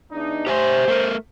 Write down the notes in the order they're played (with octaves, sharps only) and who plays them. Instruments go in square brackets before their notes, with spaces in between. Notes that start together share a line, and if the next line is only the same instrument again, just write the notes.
[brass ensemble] E2 D4 D#4
[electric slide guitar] G4 E5 G#5 [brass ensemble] C5
[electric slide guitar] A3 A#4